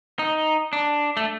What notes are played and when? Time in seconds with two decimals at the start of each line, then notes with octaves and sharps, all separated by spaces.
0.19 D#4
0.73 D4
1.17 A3